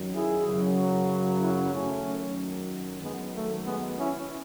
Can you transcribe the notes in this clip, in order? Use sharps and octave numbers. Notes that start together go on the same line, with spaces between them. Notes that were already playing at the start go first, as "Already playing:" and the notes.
Already playing: F#2 D#3 F#3
E4 G#4
F#2 C#3 F#3
C#4 E4
F#2 D#3 F#3 A3 C#4
F#2 D#3 F#3 G#3 B3
A3
G#3 B3
C#4 E4